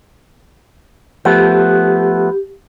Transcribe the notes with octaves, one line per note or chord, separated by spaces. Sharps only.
F3 A3 B3 G4